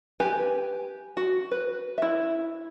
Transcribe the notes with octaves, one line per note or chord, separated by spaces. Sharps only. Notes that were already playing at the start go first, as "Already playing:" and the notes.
G4 B4 G#5
F#4
B4
E4 E5